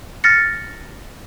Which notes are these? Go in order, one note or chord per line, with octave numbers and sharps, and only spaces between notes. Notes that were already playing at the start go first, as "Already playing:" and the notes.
F6 A6 A#6 C#7